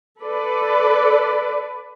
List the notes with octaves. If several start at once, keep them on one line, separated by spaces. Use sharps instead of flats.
A4 B4 D5